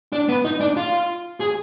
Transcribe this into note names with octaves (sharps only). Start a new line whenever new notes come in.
D4
B3
D#4
D4
F4
G#4